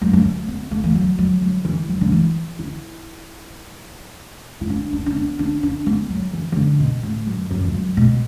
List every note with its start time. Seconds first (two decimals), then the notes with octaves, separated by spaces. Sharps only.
0.02 F#2
0.13 F#3
0.25 A3
0.48 B3
0.71 A3
0.84 E3
0.95 F#3
1.19 F#3
1.42 F#3
1.65 E3
1.89 F#3
2.01 D3
2.12 E3
2.59 E4
4.61 E4
4.70 D4
4.93 D4
5.06 D4
5.16 B3
5.39 D4
5.63 D4
5.86 B3
6.10 F#3
6.33 E3
6.52 E3
6.56 D3
6.80 B2
7.03 A2
7.27 F#2
7.51 F#2
7.65 E2
7.74 F#2
7.97 B2